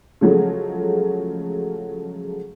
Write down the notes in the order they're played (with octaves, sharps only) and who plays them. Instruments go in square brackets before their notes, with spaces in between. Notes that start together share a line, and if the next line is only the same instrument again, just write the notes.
[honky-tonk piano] C#3 F3 F#3 G#3 A3